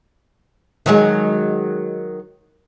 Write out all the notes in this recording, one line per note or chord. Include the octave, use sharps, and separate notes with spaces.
D#3 F#3 G#3